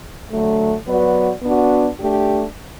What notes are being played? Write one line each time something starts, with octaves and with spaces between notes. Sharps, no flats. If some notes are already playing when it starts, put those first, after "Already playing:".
D3 F#3 A3
F#3 B3 F#4 B4 D5
B3 D4 F#4
A3 D4 G4